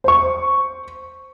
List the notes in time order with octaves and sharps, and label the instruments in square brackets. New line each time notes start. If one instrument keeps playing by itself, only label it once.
[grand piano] C5 C#6